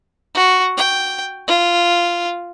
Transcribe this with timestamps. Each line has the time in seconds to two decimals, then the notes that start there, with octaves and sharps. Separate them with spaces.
0.35 F#4
0.77 G5
1.48 F4